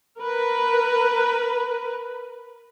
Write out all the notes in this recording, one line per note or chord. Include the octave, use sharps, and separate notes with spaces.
A#4 B4